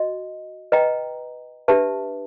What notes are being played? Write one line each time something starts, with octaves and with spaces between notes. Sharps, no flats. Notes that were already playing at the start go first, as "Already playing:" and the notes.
Already playing: F#4 D#5
B4 D#5 G5 A#5
D4 G4 B4 E5 A5